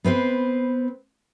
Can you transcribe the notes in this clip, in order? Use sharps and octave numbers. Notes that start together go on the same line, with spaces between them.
B3 C4 B4 C5